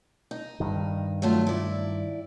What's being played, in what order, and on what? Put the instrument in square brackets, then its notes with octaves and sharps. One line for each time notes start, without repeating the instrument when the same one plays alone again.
[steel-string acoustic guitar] D#4
[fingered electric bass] G2 D#3
[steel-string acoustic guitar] F#3 A3 F4
E4 D5